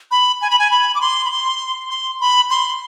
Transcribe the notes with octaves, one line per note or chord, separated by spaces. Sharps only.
B5
G#5
B5
G#5
B5
D6
C6
B5
C6
C6
B5
C6